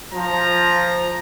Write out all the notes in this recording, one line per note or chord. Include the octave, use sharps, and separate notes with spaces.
F3 A#5